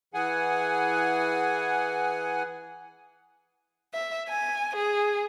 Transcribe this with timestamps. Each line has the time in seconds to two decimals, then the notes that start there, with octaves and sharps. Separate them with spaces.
0.14 E3 G#4 F#5 G#5
3.93 E5
4.28 G#5
4.74 G#4